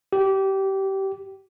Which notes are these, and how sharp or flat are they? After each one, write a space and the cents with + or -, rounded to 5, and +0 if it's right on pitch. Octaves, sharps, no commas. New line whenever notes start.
G4 -20